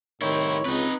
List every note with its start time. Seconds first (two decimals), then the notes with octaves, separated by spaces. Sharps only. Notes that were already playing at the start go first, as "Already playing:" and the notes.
0.22 C2 A2 D#3 C4 E4 C#5
0.66 C#2 C4 D#4 B4